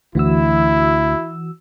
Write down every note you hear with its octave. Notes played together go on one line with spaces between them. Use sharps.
D2 E3 E4 F#4 E6